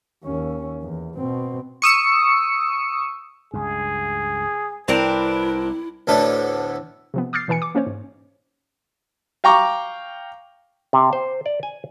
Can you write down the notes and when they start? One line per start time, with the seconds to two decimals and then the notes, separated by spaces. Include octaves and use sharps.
0.23 D#2 C#4
0.82 E2
1.15 B2 C4
1.82 C#6 D#6 E6 C#7
3.53 C#2 G2 G#4
4.88 C2 C4 D4 E4 A#4 B4
6.07 D2 A2 D3 B3 A4
7.14 C3 F3 B3
7.33 D6 D#6 F6 G6 A6 C7
7.48 B2 E3 B4 G#5 C#7
7.62 D6
7.75 A#3 C#4 C5 C#5
7.87 G#2
9.44 F5 G5 A#5 C#6 D6
10.93 C3
11.13 C5
11.46 D5
11.63 G#5